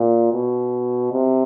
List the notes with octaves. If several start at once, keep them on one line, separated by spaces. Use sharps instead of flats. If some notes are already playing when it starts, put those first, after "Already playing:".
Already playing: A#2
B2
C3